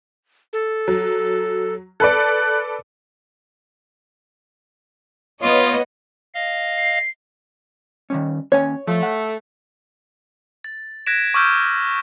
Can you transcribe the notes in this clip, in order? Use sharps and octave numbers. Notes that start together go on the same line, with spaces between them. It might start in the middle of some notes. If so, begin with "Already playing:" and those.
A4
F#3
A4 B4 D5 F#6
B3 F4 C#5 D#5
D#5 F5
C7
D#3 G3 C#4
D#2 C#4 C#5 G#5
F3 A3
F#5
A6
F#6 G#6 A#6 B6 D7 E7
C#6 D6 E6 F6 G6 D7